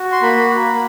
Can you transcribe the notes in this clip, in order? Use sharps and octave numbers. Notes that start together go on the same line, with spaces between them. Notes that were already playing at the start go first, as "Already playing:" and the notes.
Already playing: F#4
C6
A#3 B5
A#3